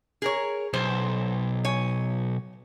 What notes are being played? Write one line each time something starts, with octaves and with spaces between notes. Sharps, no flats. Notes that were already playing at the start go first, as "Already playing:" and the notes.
G#4 A#4 C#5
B1 C5
C#5 G#5